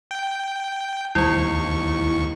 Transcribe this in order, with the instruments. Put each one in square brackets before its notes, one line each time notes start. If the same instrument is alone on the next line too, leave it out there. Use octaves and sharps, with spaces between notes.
[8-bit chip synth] G5
[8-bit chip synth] D#2 C#6 [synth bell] G3 E4